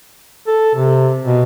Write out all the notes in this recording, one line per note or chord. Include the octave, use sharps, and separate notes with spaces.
A4
C3
B2